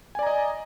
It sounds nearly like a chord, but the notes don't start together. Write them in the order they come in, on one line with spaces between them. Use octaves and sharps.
G#5 D5 A#5 D#5